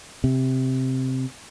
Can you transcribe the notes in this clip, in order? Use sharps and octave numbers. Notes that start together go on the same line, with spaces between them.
C3